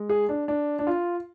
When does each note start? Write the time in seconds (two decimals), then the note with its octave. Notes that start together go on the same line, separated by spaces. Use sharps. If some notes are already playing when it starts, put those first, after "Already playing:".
Already playing: G#3
0.09 G#4
0.29 D4
0.48 D4
0.79 D4
0.87 F4